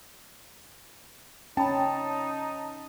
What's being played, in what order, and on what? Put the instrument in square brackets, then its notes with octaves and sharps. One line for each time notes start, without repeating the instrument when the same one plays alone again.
[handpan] C#4 [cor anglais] D#4 [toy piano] G5 B5 [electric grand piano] A5